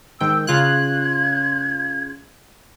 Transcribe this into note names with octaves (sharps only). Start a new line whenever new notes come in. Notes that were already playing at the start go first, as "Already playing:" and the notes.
G#2 D#3 G5 E6
C#3 F4 F#6 G#6